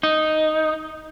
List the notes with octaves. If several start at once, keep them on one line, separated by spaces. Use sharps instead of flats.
D#4